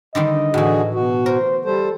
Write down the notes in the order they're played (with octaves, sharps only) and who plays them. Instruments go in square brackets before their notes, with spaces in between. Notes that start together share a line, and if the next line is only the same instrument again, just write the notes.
[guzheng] D3 D#3 G3 [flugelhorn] D#5
[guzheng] A2 E3 [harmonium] D3 F#4 G#4
[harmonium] B2 F#4
[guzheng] A#4 [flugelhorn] C5
[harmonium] G3 C5 [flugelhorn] A4